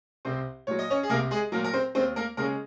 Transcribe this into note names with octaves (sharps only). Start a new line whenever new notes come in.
C2 C4 C5
A#2 F#3 C#5
D#5
C#4 C#5
G#4
C2 A#3 A#4
G#3 G#4
A#2 F#3 A#3 A#4
A#4
C4 C5
D#2 C4 C5
A#3 A#4
C#3 G#3 A#3 C#4 A#4